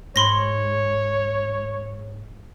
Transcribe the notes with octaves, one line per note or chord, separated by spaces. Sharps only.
G#2 C#5 B5 C6 A#6